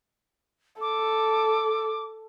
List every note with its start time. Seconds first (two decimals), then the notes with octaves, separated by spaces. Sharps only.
0.81 A4 D6